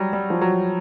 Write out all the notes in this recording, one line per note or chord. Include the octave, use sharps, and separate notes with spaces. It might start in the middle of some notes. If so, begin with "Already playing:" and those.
Already playing: F#3 G3
G3
F3
F#3